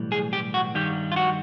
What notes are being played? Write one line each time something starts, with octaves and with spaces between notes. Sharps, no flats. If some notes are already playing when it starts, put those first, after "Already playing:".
Already playing: B1 A2 E3 G3
G#4
G4
F#4
G2 D#3 G3 G4
F4
F#4